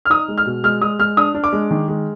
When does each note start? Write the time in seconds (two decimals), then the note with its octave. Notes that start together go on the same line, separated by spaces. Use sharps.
0.05 F6
0.10 D#4 D#6
0.28 G#3
0.38 F6
0.46 B2
0.64 G#3 F6
0.82 G#3 D#6
0.99 G#3 F6
1.17 D4 D#6
1.35 D4
1.44 D6
1.53 G#3
1.71 D#3
1.88 G#3